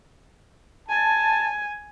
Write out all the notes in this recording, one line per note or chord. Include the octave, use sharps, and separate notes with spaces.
G#5 A5